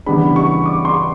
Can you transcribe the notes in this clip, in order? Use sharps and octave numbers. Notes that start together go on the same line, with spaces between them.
C#3 E3 G3 B3 D4 B5
C#6
D6
C6